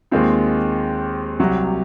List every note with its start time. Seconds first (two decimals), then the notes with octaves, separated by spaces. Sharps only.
0.11 D#2 D#3 G#3 C4 F4
1.40 C2 C3 F#3